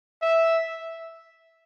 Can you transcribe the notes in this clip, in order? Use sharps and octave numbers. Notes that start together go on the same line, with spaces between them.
E5